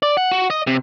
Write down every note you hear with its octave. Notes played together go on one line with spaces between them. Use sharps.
D5
F#5
F#4
D#5
C3